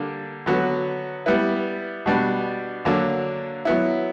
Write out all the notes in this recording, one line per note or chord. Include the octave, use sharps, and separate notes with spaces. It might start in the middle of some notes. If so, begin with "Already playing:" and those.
Already playing: D3 G3 A#3 D4
D3 F#3 B3 F#4 B4
G3 B3 E4 B4
B2 G3 B3 D4
D3 F#3 A#3 D4
F#3 B3 E4